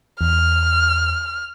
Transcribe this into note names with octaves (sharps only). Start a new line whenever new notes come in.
E2 F6